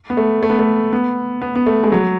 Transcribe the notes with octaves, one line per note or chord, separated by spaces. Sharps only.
B3
A3
A3
B3
A3
B3
B3
B3
A3
G#3
F#3